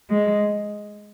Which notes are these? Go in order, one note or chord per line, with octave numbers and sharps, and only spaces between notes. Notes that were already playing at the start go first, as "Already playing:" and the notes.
G#3